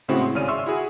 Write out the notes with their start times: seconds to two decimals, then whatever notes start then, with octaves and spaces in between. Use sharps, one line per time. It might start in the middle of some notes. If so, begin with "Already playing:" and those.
0.08 A2 C#3 G#3 C4 E4 F#4
0.22 C6
0.35 G#1 C#3 C#4 D5 F6 D#7
0.48 E5 C6 C#6 E6 F6
0.66 E4 F#4 G#4